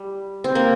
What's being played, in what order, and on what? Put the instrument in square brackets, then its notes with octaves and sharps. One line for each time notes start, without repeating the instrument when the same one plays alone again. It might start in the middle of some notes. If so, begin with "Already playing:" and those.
Already playing: [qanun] G3
C4
A#3